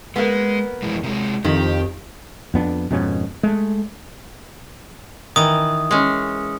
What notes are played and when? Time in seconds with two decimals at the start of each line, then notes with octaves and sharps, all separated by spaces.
0.16 G#3 A#3 B3
0.82 F2 E3 G#3
1.03 C3 G#3
1.45 F2 D#3 G4
2.54 F2 B3 C#4 D4
2.90 F2 G#2 B2 C#4
3.43 G#3 A3
5.36 D#3 E3 D#6
5.91 G#3 C#4